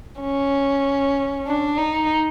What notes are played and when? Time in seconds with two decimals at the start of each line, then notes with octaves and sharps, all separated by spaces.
0.21 C#4
1.47 D4
1.79 D#4